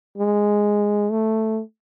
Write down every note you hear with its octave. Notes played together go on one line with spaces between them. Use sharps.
G#3
A3